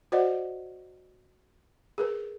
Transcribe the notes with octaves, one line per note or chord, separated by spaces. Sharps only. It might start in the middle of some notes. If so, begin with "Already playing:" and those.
F#4 C5 D5 D#5 F#5
G#4 A#4 B4